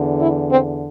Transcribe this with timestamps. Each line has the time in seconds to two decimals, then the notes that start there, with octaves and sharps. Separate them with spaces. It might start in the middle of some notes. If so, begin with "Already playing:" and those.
Already playing: E2 D3
0.20 E4
0.49 C4